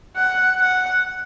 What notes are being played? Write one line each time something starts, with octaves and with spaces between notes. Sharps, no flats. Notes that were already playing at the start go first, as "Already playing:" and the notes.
F#5
F#5